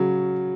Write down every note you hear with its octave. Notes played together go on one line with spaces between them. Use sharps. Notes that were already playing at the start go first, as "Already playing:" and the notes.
Already playing: C#3 F#3